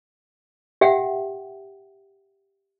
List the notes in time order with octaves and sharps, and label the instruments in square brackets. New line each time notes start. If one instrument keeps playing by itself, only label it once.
[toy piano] G4 E5 F#5 G5